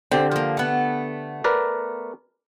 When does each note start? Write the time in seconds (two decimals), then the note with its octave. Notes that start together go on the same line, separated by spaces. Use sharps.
0.12 D3 C4 G4
0.31 F3 A#3
0.57 A3 B3
1.44 A#4 B4 D5